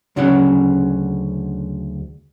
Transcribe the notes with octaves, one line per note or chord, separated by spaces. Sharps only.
D2 C#3 F#3 C#4 F#5